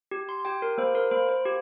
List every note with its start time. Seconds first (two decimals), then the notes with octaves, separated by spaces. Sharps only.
0.11 G4
0.29 C6
0.45 G4 G5
0.62 A#4
0.78 A#3 C5
0.95 A#4
1.11 A#3 C5
1.29 C5
1.46 G4